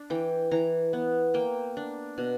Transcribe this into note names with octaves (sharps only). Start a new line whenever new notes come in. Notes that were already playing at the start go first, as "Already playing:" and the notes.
Already playing: D4
E3 G5
E3 A#5
B3
A#3 G5
D4
B2